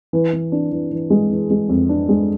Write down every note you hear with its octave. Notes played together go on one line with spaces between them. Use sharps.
E3
E3
D4
E3
E3
G#3
E3
G#3
F2
D4
G#3